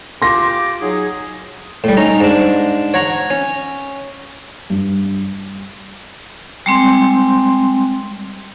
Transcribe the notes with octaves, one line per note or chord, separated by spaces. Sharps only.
F4 G4 C6 D6 A#6
F#3 D#4 G#4
A2 G3
C#4 D#4 A#5
G#2 D4
C#5 F#5 A#5 C#6
C#4
G2
G3 G#3 C4 C6